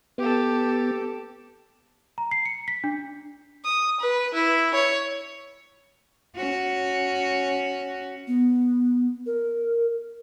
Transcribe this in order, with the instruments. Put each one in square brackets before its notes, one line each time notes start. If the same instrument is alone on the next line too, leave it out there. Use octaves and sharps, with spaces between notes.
[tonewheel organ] B3 [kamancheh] G4 A4
[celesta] A#5
C7
C#7
B6
D4
[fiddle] D#6
B4
E4
C#5
[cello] C#4 F#4
[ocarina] B3
A#4